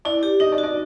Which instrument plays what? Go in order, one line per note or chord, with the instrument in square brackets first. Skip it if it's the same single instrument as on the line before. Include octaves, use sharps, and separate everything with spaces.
[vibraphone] E4 [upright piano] D5
[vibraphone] G4
[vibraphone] D#4 [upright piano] D#5
[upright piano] D5
[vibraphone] F#4
[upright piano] D5